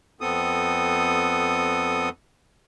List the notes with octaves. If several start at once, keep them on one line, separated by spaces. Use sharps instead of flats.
F2 B3 C4 A4 D#6